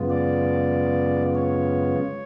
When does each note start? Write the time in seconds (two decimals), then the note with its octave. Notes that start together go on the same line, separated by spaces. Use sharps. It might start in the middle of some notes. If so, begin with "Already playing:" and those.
Already playing: F#2 C#3 G#3 B3 F4
0.10 D5
1.35 C#5